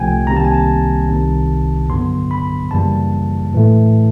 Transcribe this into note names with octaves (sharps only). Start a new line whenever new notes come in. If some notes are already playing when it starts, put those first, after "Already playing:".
Already playing: C2 C3 F3 A3 G5 G#5
C2 C3 D#3 G3 A#3 A#5
A5
G#5
A5
C2 C3 D#3
G2 D3 F#3 B3 C6
B5
F#2 C#3 E3 G3 A#3 A5
A2 E3 A3